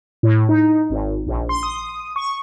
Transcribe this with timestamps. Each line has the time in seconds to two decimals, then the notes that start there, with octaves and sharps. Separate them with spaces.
0.23 A2
0.49 D#4
0.90 G#1
1.27 A#1
1.49 C6
1.63 D#6
2.16 C#6